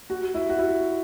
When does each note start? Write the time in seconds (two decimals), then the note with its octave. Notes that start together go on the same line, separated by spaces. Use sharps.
0.10 F#4
0.35 E4
0.49 F#4
0.58 E4